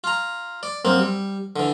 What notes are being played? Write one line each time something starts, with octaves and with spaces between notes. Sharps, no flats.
F4 A#5
D5
F#2 A#3 C4
G3
D3 E3